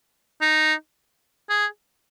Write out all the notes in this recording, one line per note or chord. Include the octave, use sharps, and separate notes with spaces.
D#4
G#4